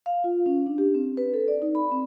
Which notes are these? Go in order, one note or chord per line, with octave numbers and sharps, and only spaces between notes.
F5
F4
C#4
D4
G4
C4
B4
A4
D5
D#4
B5
C4